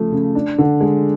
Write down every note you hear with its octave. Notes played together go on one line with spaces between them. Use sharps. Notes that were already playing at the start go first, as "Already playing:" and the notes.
Already playing: C#3 F3 A3
C#3
D4
D3
G#3